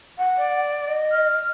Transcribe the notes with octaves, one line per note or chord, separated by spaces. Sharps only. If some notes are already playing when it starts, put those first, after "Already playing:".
F#5
D5
D#5
F6